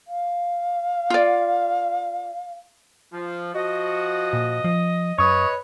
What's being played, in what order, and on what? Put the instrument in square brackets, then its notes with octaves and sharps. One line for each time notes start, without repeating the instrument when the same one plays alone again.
[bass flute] F5
[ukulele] F4 D5
[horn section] F3
[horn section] F3 F#4 [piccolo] D#5
[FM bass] A#2
F3
[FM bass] F#2 [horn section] B4 C#5 [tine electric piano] C#6 D#6